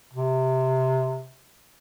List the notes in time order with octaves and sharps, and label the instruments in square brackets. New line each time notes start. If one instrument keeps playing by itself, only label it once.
[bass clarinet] C3